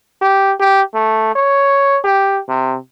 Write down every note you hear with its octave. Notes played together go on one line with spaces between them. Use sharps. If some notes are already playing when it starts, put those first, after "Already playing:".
G4
G4
A3
C#5
G4
C3